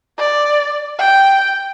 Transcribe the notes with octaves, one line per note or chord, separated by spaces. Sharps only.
D5
G5